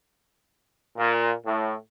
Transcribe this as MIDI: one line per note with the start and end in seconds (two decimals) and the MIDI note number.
0.97 1.33 46
1.46 1.74 45